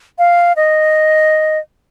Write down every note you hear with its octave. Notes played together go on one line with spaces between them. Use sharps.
F5
D#5